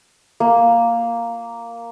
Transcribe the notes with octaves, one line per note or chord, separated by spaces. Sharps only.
A#3